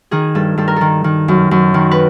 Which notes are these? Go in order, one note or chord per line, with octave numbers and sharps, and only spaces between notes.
D#3 G#4
G2 A4
G2 A4
A#4
D#3 A4
D#3
F#2
F#2
D#3
B4